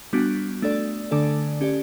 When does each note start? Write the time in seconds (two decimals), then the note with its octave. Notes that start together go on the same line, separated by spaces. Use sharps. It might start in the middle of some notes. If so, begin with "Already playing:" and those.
0.13 G3 B3 D4 F#4
0.62 A3 D4 A4 D5
1.11 D3 A3 D4 A4 D5
1.61 C#4 G4 D5